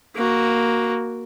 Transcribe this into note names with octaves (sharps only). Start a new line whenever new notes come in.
A#3 F#4